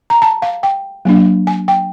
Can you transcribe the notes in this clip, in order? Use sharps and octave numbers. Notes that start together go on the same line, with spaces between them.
A#5
A5
F5
G5
F#3 A#3 D4
G#5
G5